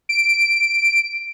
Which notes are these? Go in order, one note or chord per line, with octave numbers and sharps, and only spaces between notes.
D7